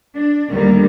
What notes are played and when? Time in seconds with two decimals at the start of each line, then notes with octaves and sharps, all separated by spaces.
0.16 D4
0.48 D2 D#3 G3 A#3